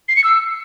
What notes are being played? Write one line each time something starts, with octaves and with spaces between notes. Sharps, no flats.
C7
C#7
E6